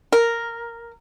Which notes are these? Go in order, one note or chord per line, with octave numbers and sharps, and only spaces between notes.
A#4